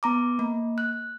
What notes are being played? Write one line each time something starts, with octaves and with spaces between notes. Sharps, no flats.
B3 A#5 D6
A#3
F#6